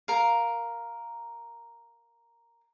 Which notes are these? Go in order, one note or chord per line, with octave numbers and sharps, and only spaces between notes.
A#4 F5